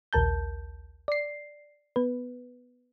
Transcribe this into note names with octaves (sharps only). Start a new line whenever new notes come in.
A#1 D#2 A#4 A5 G6
D5 C7
B3 B4